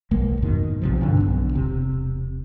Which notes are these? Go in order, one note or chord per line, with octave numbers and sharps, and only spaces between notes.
B1 G#3 A#3
F2 G#2 B2 D#3
B1 C3 F3
G2 B2 D3 D4
B1 B3
E1 C3